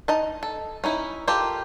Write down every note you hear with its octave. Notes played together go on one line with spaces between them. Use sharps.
D#4 D#5 A5
A4
C#4 D#4 E4
F4 G4 A4 A#4